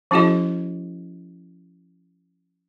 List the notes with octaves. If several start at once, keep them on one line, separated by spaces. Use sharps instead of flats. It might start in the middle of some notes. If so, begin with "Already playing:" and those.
F3 C#4 E4 F#4 G#4 D#5